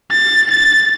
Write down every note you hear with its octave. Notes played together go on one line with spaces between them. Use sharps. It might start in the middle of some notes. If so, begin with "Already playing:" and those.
A6
A6